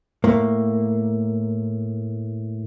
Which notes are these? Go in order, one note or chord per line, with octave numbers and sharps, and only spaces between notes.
A2 A#3